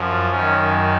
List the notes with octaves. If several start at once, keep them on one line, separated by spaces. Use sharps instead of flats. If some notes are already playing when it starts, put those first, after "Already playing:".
Already playing: F#2 F3
F#2 D#3 C#4